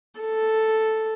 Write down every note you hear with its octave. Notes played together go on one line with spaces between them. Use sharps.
A4